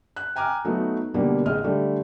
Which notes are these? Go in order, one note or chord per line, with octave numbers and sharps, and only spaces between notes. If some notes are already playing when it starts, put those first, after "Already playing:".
F#6
G5 G#5 A#5 D6 F6
F#3 A3 B3 D#4
B2 D3 G3 A#3
A1 G#3 D#5 F6
D3 G3 A3